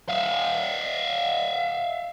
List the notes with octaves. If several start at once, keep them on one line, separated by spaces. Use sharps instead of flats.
E5 F5